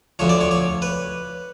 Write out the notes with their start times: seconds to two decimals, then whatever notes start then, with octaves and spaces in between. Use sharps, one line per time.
0.19 D2 D3 F3 C#5
0.29 D5
0.41 C#5
0.51 C#5
0.82 B4